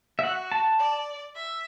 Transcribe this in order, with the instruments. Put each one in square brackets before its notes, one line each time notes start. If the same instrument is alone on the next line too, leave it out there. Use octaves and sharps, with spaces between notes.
[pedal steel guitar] E5
[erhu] F#4 [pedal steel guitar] F#5
[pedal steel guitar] A5
[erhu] D5
E5